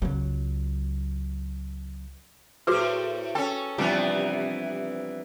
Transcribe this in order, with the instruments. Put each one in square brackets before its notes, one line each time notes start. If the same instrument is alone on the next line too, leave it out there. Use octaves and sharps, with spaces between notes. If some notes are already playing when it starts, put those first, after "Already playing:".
[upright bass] C#2 F#3
[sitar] A2 C5 [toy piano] F#4 G#4 B4
[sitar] C#4 A4 [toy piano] G5
[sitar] C3 E3 B3 [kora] F3 G3 D4